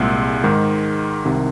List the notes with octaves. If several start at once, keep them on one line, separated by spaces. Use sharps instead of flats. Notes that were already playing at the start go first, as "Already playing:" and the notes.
Already playing: C2 A#2 G#3
G#2 D#3 G#3
C2 C3 D#3